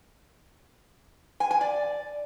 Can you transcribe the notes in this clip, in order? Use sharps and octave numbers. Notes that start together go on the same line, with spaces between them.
G#5
G#5
D5